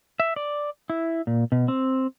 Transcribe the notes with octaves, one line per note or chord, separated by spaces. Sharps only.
E5
D5
E4
A#2
B2
C4